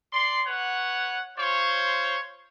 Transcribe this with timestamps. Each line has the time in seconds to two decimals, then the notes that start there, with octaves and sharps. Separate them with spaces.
0.13 D5 C6
0.46 B4 C#5 F#5
1.38 F4 C5 C#5